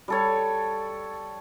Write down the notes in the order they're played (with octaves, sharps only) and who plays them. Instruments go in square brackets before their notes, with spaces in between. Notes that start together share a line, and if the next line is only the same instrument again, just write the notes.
[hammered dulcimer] G3 A4 C#5